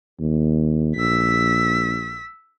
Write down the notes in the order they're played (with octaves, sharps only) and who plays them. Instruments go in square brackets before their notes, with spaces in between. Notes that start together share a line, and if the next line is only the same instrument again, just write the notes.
[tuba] D#2
[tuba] A#1 [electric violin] E6 B6